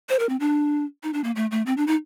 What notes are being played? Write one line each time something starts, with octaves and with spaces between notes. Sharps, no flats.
C5
A#4
C4
D4
D#4
D4
A#3
A3
A3
C4
D4
D#4